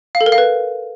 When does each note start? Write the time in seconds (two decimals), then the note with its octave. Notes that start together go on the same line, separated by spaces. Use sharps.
0.15 F5
0.21 A4
0.26 A#4
0.32 F5
0.38 B4